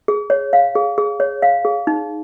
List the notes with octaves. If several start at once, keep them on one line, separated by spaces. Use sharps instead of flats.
G#4
C#5
F5
G#4
G#4
C#5
F5
G#4
D#4